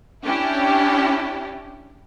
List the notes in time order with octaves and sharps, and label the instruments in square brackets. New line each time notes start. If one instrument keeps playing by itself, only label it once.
[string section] C#4 D4 E4 G4